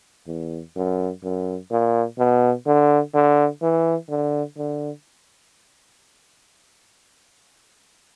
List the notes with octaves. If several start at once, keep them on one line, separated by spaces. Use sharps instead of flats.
E2
F#2
F#2
A#2
B2
D3
D3
E3
D3
D3